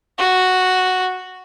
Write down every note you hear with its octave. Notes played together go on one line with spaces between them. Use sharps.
F#4